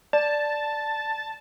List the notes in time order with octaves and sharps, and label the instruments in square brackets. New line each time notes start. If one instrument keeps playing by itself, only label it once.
[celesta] D5 [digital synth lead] A5